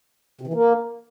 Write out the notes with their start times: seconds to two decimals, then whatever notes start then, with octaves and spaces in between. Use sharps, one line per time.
0.41 C3
0.47 E3
0.54 A#3